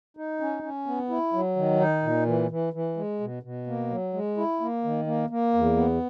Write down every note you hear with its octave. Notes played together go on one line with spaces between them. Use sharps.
D#4
C#4
C#4
B3
E4
F#3
D#3
D#4
A#2
E3
E3
E3
G#3
B2
B2
A#3
F#3
G#3
E4
A#3
D#3
A#3
A#3
E2
B3